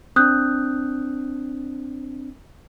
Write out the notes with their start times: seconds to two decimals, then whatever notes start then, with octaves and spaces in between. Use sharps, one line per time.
0.16 C4 D4 D#6 F#6 G6